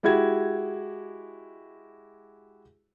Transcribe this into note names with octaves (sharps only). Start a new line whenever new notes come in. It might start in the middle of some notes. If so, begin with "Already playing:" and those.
G#3 E4 F#4 G4 G#6